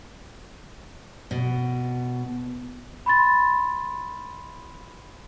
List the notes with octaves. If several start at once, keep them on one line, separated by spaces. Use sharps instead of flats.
B2
B5 C6 A6